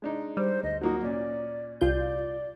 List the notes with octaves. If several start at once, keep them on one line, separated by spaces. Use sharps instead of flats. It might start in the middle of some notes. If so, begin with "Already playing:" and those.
G#3 D4 D#4
G3 C5
D2 D#5
F#3 A#3 D#4 F#4
A#2 C#4 D5
C2 F4 D5 G6